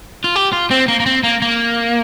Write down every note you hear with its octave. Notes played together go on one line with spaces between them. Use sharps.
F4
G4
F4
C4
A#3
A#3
C4
A#3
A#3